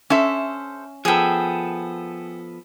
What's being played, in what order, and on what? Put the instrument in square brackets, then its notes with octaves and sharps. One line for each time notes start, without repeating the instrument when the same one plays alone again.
[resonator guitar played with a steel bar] C#4 E5 [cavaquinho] A4 C5
[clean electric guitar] F3 B3 A4 [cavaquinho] G#4 G5